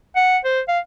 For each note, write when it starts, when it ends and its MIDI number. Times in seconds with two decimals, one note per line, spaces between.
0.16 0.38 78
0.45 0.60 72
0.68 0.79 77